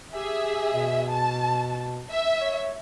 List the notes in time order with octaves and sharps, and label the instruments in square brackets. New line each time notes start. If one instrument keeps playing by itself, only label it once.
[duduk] G4 [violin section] G#4 E5
[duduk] B2
[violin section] A5
E5
[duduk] C#5